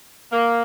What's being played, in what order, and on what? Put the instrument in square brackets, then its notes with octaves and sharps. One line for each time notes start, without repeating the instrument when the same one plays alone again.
[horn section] A#3